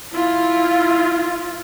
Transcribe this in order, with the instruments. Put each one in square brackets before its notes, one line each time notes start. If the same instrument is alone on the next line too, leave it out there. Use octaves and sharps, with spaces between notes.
[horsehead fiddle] E4 F4